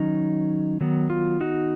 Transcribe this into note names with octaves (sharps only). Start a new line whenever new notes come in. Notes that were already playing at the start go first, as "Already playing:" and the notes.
Already playing: D#3 F#3 C#4 D#4
D#3 F#3 B3
F4
D#4 F#4